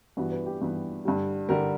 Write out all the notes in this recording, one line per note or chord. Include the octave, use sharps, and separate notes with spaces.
G2 E3 B3 F#4
B4
G4
G2 E3 B3
G2 D3 G3
G2 D3 G3 A#4